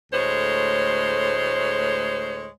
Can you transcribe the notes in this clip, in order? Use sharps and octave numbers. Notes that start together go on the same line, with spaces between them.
D2 A2 G#3 C5 C#5